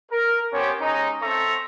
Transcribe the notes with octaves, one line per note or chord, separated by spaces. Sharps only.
A#4
B3 C#4 G4 C5 C#5
G#3 C#4 D#4
C4 A4 E5 A#5 C#6